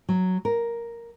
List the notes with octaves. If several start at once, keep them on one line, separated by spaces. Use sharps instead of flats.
F#3
A#4